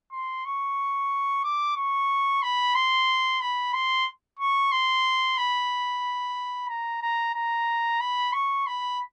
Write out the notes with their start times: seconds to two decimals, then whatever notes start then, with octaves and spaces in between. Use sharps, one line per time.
0.12 C6
0.45 C#6
1.44 D6
1.76 C#6
2.42 B5
2.75 C6
3.41 B5
3.73 C6
4.39 C#6
4.72 C6
5.38 B5
6.69 A#5
7.02 A#5
7.34 A#5
8.00 B5
8.33 C#6
8.66 B5